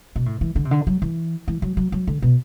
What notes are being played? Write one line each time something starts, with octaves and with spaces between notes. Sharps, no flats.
B2
A2
E3
D3
C3
D3
F#3
E3
E3
F#3
F#3
F#3
D3
B2